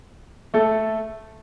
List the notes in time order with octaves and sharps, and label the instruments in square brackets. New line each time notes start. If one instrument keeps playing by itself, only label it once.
[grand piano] A3 A4